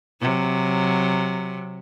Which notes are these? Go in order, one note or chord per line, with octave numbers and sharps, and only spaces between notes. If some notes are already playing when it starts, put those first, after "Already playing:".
C3 F#3